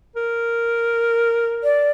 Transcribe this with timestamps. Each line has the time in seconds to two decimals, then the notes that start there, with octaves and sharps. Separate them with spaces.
0.16 A#4
1.63 D5